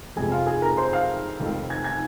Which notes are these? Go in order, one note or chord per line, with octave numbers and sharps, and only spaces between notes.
F1 F2 C3 G#4 G#5
F4 F5
G#4 G#5
A#4 A#5
C5 C6
F5 F6
F1 F2 D#3
G#5 G#6
G#5 G#6